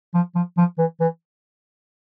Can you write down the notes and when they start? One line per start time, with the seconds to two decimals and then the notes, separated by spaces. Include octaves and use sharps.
0.14 F3
0.35 F3
0.58 F3
0.78 E3
1.00 E3